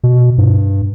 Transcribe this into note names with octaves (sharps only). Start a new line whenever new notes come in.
B2
G2